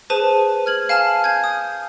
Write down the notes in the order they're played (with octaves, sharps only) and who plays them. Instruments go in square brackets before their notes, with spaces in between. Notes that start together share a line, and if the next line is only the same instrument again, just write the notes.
[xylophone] G#4 B4 C5 A5 D#7
F6 G#6 F#7
F5 G#5 A5 F6
G#5 G6 G#6
D#6